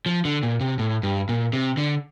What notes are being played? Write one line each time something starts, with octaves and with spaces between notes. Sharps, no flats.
F3
D3
A#2
C3
A2
G2
A#2
C3
D3